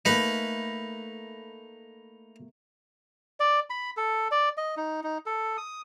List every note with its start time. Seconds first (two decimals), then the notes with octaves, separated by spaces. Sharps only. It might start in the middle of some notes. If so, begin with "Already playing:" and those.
0.05 A3 A#3 D#4 B4
3.40 D5
3.70 B5
3.97 A4
4.31 D5
4.57 D#5
4.77 D#4
5.03 D#4
5.26 A4
5.57 D#6